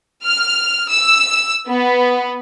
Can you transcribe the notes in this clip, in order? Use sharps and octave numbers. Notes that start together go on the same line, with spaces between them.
F6
E6
B3